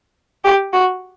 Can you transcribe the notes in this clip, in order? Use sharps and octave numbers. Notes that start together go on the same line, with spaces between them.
G4
F#4